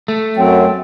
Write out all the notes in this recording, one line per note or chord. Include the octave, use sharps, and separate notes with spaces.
A3
F#2 F#3 C4 G5